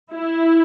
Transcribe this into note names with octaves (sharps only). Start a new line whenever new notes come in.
E4